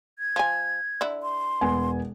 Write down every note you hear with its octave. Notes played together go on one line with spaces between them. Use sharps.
G#6
F3 G#5
D3 E4
C6
E1 B3 G#5